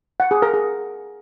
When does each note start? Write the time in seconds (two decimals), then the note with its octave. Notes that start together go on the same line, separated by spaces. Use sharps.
0.20 F#5
0.31 G#4
0.42 A#4
0.54 G#4